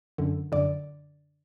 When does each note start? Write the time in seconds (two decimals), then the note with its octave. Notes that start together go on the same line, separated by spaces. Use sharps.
0.18 F#2 D3
0.52 F#2 D3 D5